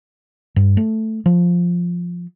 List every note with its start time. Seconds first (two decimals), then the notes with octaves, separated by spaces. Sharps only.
0.56 G2
0.77 A3
1.26 F3